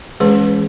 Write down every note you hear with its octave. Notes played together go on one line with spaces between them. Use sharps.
E3 G#3 C#4 G#4 B4